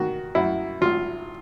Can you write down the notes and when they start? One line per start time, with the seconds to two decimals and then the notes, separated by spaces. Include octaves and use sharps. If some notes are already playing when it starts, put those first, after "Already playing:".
Already playing: D#3 F#4
0.35 F#2 E4
0.81 G#1 F4